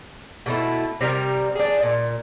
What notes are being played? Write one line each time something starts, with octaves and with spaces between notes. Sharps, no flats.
B2 A3 E4
C3 G3 A#4
D4 G#4
A#2